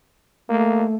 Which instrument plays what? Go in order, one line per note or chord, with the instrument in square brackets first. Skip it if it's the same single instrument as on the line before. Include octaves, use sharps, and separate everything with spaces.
[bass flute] A3 [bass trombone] A#3